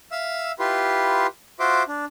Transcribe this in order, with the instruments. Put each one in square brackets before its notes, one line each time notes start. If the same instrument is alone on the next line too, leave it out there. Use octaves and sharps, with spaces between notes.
[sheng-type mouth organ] E5 F5 E6
E4 F4 G4 B4 C6
F4 F#4 C5 E5 C6 D6
D4